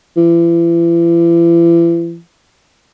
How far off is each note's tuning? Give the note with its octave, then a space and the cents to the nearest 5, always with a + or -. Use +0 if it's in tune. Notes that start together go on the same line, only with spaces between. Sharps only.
E3 +40